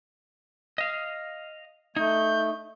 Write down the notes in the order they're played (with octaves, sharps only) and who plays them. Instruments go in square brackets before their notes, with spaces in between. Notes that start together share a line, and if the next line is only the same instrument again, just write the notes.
[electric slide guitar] D#5 F5
[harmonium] A3 [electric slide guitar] D#4 [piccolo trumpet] G6